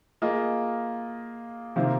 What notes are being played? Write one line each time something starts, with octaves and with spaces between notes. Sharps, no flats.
A#3 F4 G#4 D#5
C3 D#3 A#3 F4 C5